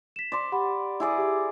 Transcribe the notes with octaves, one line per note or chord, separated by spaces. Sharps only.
B6 E7
D5 C6
G4 F#5 B5
E4 G#4 D5
G4 D6